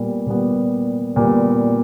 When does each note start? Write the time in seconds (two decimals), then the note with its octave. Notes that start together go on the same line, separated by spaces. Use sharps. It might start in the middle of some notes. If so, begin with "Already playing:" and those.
Already playing: A#2 G3 B3
0.27 A#2 G3 B3
1.16 A#2 G3 B3